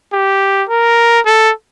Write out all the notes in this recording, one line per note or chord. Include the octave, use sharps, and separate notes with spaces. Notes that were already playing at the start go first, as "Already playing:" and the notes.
G4
A#4
A4